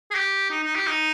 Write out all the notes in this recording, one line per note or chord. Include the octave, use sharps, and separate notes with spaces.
G#4
G4
D#4
D#4
G4
D#4